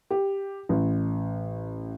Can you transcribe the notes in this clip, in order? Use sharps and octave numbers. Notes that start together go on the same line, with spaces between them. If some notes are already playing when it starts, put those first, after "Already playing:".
G4
A1